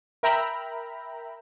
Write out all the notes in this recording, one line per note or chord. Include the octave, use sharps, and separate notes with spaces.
A#4 E5 G5 A#5 B5